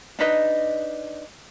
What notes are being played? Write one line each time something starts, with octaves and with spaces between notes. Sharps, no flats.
D4 D#4 B4 D#5